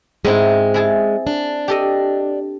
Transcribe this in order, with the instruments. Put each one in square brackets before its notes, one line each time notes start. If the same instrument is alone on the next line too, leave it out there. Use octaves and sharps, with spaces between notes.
[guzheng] G#2 C4 E4 [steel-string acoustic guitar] G#3
[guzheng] E4 G#4 A5
[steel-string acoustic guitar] D4
[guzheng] G4 A4 D#5